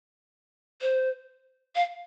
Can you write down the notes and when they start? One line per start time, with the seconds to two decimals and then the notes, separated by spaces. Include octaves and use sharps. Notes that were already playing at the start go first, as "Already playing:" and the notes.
0.82 C5
1.75 F5